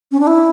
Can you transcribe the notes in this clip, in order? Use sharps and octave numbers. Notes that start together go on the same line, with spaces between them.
C#4
D4
E4